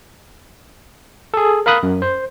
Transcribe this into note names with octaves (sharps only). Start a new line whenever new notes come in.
G#4 A4
A#4 F5 B5 D#6 F#6
F#2
C5